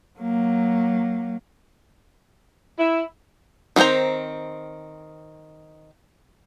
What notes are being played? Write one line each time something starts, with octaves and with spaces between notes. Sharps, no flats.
F#3 A#3
E4
D#3 G#3 C4 C5 A#5